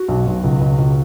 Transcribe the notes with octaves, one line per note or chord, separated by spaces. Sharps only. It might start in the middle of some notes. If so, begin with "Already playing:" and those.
Already playing: F#4
B1
B1
C#2
C#2
C#2